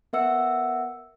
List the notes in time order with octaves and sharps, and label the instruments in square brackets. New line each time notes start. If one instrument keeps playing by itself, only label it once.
[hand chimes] B3 A#4 E5 F#5 E6 C#7